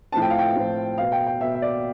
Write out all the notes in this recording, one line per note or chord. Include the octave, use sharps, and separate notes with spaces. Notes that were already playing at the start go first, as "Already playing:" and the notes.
A2 F3 C4 A5
G5
F5
G5
A2 F3 C4
B2 B3 F5
G5
G5
B2 B3 E5
E5
D5